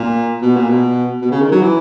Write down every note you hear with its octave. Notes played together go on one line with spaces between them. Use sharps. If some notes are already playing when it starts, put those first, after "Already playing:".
Already playing: A#2
B2
A#2
B2
B2
C#3
D#3
F#3
E3